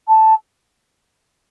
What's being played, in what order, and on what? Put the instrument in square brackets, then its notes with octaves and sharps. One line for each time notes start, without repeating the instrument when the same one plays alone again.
[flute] A5